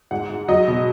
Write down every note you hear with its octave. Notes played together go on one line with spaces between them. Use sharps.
G#2 F#5
G#2
F#3 D#5
B2